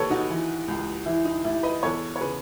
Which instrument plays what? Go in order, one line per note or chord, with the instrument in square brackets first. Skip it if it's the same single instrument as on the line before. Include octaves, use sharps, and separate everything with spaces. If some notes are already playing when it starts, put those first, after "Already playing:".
Already playing: [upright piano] D#2 A4 B4 C#5
D#4 F#4
E3
C#2
E3 E4
D#4
A1 E4
B4 D#5
E2 A4 C#5
C#5
C#3 G#4 B4